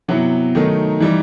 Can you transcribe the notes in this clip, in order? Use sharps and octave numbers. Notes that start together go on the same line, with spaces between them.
C3 F#3 B3 E4 F#5
D#3 F#3 A3 D#4
E3 G3 D#4